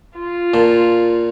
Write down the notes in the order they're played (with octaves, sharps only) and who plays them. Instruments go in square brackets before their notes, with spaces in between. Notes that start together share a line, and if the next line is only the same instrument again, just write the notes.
[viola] F4
[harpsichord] A#2 A5